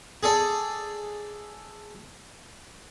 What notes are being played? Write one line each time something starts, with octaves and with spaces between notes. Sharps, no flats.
G#4 A4 D5